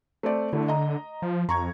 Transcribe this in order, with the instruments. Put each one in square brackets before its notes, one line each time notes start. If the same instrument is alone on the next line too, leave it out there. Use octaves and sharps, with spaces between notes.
[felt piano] A3 C4 D5
[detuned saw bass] D3 [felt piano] A3 E4
[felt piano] D#5 A#5
[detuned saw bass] F3
[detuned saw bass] F2 [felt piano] A#5 C#6 G#6